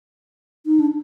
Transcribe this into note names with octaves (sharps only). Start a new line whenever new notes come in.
D#4
D4